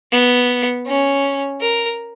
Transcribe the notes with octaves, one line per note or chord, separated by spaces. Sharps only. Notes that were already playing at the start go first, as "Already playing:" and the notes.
B3
C#4
A#4